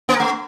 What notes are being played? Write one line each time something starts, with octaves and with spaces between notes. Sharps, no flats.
A#3
A#4
A3